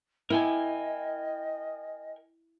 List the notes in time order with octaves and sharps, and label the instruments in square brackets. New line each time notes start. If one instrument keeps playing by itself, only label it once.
[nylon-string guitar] E4 [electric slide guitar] A#4 G5 G#5 [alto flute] D#5